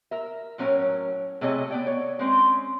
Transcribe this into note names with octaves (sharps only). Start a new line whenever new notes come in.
A#4 E5
A2 F#3 C#4 A#4 C#5 G5
C3 A3 F#4 G#4 C#5 D#5
B3 D5 G5
C#5
G#3 C4 C#4